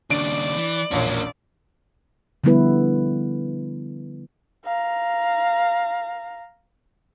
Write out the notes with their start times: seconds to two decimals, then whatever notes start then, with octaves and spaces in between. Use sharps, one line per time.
0.10 D#2 C#3 D4 D5 D7
0.57 E3
0.91 E1 A#1 A#3 C#4 C#5
2.44 D3 F3 G3 B3 E4 B4
4.65 F5 A#5